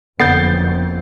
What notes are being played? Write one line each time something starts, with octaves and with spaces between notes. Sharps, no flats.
F#1 F2 D3 B3 G6 A6 C7